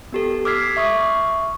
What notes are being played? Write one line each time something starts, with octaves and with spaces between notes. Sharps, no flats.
B3 G4 A4
D6 E6 F6 G#6 B6 C7
E5 C#6 D#6